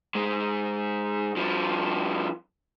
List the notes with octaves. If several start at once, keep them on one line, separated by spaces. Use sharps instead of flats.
G#2 G#3
G2 F3